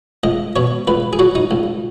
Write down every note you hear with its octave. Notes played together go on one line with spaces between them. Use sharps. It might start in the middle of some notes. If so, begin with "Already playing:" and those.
C#2 D#5
B2 C#5
C#2 B4
G#4
F#3 F#4
D#4
C#2